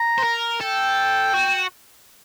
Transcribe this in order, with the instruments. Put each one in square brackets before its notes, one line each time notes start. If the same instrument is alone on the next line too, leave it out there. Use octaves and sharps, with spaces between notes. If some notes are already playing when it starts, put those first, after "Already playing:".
Already playing: [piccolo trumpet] A#5
[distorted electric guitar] C5
A#4
[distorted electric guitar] A4 [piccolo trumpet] G5
[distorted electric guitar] F#4